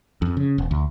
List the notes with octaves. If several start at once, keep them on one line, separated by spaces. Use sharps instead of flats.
F2
C#3
E1
D2